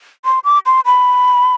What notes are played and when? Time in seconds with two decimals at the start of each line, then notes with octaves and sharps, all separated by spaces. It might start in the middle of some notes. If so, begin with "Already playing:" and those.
0.25 C6
0.44 D6
0.66 C6
0.86 B5